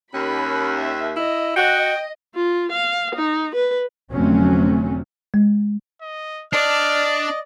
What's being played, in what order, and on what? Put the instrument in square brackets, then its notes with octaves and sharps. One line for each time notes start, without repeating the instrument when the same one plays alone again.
[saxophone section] D#2 [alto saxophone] C#4 [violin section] B5
[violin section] E5
[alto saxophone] E4 [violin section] D#5
[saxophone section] F#4 [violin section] D#5 [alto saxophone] G5
[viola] F4
F5
D#4
B4
[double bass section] F1 D3 F#3 A3 C4 C#4
[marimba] G#3
[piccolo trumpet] D#5
[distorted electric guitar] D4 [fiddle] D5 [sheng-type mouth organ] D#5 [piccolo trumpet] F6